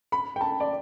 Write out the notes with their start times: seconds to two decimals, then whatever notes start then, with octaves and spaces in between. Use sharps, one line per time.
0.12 B5
0.36 G5
0.41 A5
0.60 D5